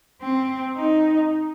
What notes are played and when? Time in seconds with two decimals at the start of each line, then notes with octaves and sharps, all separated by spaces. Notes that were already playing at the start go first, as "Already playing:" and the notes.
0.22 C4
0.77 D#4